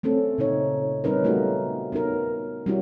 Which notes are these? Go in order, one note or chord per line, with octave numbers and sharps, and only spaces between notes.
A3 C4 C#4 A4
A#2 C#3 D#4 C#5
G3 C4 C#4 D#4 A#4 B4
G3 A3 B3 D#4 F4 F#4
B3 C#4 D#4 A#4
G3 C#4 E4 F#4 G4